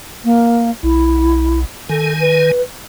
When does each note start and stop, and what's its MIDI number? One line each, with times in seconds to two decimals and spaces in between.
0.24 0.70 58
0.83 1.65 35
0.83 1.59 64
1.89 2.51 51
1.89 2.12 69
1.89 2.51 80
2.20 2.61 71